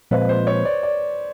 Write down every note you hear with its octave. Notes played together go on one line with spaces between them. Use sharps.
A#2 F3 G#3 C4 B4
C5
C#5
D5
D5